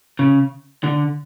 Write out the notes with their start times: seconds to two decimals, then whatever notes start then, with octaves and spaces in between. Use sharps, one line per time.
0.19 C#3
0.84 D3